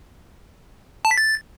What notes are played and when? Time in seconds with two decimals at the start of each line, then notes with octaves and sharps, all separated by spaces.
1.05 A5
1.11 B6
1.17 A6